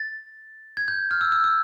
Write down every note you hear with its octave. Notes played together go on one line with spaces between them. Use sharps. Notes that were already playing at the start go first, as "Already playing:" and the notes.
Already playing: A6
G#6
G6
F6
E6
E6
E6